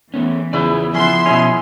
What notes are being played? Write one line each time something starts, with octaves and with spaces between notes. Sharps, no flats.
E3 A3 B3 C#4
E2 C#3 E4 F4 G#4 B4 C#5 D5
F3 B3 C#4 E5 C6
B2 C#4 E4 G#4 D#5